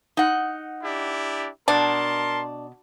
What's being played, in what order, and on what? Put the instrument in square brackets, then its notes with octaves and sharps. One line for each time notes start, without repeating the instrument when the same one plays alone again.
[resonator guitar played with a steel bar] D#4 F#5
[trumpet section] D4 E4 G4
[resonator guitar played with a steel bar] B2 [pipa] D4 [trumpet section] A#4 A5 C6